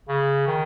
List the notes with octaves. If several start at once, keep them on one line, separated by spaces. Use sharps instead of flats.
C#3
D#3